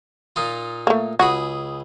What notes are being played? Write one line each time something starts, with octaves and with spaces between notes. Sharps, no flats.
A#2 D#4 F4
A3 A#3
C#2 F#4 G#4 B5